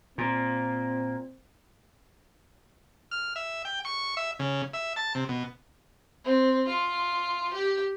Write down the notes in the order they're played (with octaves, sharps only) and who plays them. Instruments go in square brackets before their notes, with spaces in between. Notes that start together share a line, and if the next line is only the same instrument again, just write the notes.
[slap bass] A#2 [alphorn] C4
[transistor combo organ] F6
E5
G5
C#6
E5
C#3
E5
A5
C3
B2
[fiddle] C4
F4
G4